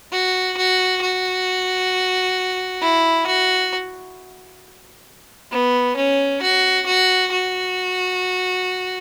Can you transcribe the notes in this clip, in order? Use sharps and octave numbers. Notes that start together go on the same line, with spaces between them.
F#4
F#4
F#4
E4
F#4
B3
C#4
F#4
F#4
F#4